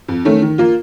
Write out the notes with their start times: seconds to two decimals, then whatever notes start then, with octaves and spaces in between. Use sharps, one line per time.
0.08 F2
0.25 D#3 A3 C#4
0.42 D#3
0.58 A#3 F4